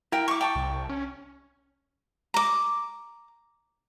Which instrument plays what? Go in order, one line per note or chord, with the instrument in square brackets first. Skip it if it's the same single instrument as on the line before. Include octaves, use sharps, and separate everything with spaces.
[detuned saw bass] E4 [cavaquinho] A#4 G5
[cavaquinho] C#6 D6
G5 A5 C#6
[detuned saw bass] C2
C#4
[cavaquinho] A#5 D6